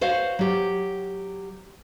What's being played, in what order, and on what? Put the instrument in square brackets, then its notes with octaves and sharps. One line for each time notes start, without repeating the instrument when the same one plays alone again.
[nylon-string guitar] F#4 C5 C#5 F5
F#3 G4